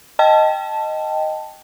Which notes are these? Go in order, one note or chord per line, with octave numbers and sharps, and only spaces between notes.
D#5 G5 A5